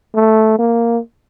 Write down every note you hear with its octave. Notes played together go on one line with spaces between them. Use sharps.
A3
A#3